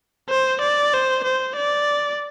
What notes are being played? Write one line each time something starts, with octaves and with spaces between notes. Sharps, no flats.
C5
D5
C5
C5
D5